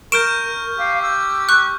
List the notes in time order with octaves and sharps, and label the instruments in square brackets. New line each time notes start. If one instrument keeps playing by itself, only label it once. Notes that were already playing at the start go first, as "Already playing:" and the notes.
[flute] A#4 [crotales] C#6 F6 G6 [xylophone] D7 E7
[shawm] G4 [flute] F5
[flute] E6
[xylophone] C#6 F#6